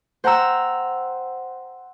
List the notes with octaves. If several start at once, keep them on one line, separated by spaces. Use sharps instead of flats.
C5 F#5 G5 A#5 E6